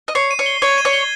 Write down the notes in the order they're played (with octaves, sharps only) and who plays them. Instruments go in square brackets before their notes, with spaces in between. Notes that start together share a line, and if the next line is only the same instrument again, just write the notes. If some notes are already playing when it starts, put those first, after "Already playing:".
[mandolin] D#5
[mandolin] C#5 [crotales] C7
[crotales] D#7
[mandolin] C#5
[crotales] G7
[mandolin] C#5 [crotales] G#6
[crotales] D#7
[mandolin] C#5
[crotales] G7